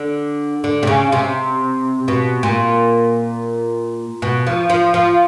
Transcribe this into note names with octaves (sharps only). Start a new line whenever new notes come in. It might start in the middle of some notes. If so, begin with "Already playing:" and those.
Already playing: D3
D3
C3
C#3
C3
B2
A#2
B2
F3
F3
F3